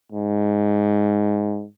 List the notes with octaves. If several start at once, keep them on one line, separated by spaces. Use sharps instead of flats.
G#2